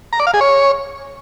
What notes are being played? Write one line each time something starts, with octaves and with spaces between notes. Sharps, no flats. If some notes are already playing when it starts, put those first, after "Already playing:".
A#5
D5
F5
G#4
C#5